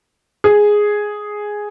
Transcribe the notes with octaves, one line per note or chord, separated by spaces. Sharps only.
G#4